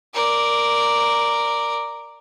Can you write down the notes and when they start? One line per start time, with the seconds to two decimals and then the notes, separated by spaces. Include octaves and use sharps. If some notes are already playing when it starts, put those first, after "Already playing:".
0.14 A#4 D5